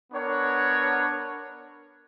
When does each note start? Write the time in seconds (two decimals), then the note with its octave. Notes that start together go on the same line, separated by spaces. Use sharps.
0.12 B3 D4 A#4 C#5 F#5